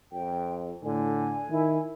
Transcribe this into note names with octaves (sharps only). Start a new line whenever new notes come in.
F2 G5
A2 D3 G#5
D#3 E4